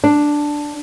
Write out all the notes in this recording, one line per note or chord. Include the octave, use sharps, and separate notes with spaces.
D4